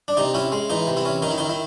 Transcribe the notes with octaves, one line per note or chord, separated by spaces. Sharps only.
D4
C3 D#4
C#4 E4
G#3
E3 D#4
C3
E4
C#4
D#3 D#4
E4
D#3 D#4
E4